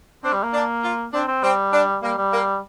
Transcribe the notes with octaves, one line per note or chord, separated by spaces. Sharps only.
C4 D4
G3
A#3
D4
F4
C4 D4
C4
G3 C4
D4
G3 A#3
G3
A#3